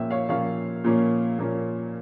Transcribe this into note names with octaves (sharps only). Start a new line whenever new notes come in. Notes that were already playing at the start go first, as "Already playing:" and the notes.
Already playing: A#2 F3 A#3 C#4 E5 G5
C#5 F5
A#2 F3 A#3 C#4 C#5 F5
A#2 F3 A#3 C#4
A#2 F3 A#3 C#4